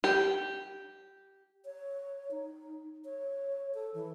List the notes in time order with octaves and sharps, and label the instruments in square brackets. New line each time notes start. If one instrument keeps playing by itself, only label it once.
[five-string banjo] G4
[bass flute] C#5
D#4
C#5
A4
E3